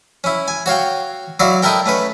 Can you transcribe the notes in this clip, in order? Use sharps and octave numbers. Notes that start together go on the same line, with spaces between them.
C#4 E4
G#5
F#4 C#5 F5 G5
F#3 E4 F#4 D5 F5
D#4 E4 A4 A#4 G5
A3 C#4 B4